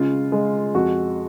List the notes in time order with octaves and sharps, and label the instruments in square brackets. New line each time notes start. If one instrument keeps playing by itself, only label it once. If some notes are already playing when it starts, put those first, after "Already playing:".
Already playing: [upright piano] C#3 G#3 F4
G#3
F2 F#4